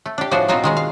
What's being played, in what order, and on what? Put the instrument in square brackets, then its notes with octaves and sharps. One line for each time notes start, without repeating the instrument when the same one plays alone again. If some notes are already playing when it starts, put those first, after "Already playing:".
[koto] A3
D4 G4
A2 F3 D4 F#4 G#4 C5
B2 C4 D#4 F4 F#4 G#4
D#3 G#3 G#4
F5